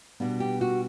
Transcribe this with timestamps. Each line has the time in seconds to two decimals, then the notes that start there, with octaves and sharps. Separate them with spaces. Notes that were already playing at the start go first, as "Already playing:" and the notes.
0.20 B2 G3 B3 D4
0.40 G4
0.61 F#4